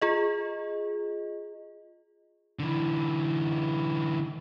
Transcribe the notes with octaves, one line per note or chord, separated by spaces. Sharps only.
F4 G#4 D#5
D3 E3